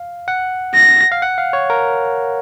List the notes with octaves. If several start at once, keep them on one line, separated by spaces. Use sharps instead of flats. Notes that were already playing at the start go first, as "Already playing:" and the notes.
Already playing: F5
F#5
A#6
F5
F#5
F5
C#5
A#4